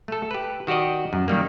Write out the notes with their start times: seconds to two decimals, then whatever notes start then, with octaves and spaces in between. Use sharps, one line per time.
0.08 A3 A4
0.31 G4 B4
0.67 D#3 F#4 G4 D5 D#5
1.13 F#2
1.28 D#3 G3 A#3